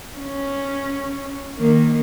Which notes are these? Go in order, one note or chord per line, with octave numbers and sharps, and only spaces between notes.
C#4
D#3 A#3